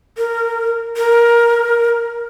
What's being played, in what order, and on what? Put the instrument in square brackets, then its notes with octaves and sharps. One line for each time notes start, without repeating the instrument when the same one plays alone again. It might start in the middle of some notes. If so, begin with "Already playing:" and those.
[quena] A#4
A#4